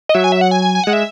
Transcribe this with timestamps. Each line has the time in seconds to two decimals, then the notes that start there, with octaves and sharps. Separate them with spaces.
0.09 D#5
0.14 F#3 E5
0.24 G#5
0.32 E5
0.41 F#5
0.51 G#5
0.62 G#5
0.75 G#5
0.84 G#3 F#5
0.93 E5